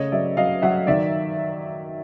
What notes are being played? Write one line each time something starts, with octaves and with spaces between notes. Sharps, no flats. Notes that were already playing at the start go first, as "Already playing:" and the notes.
Already playing: C#3 A3 C#5 D#5
F#3 D5 E5
F#3 D#5 F5
F#3 E5 F#5
D#3 D5 E5